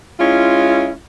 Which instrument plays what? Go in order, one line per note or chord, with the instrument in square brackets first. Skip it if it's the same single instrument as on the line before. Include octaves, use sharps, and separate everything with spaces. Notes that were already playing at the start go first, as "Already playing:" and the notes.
[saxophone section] G#3 C#4 E4 F4